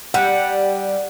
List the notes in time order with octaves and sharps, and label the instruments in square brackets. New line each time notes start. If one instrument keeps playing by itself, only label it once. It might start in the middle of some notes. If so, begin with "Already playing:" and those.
[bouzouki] G3 [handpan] F#5